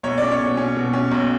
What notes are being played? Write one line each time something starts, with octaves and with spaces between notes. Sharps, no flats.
B1 C#5
C#4 D5
C#5
B2
C#4
B2
C#4
B1